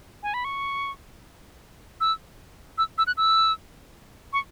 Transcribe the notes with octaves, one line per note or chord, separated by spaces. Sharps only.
G#5
B5
C#6
E6
E6
E6
F#6
E6
C#6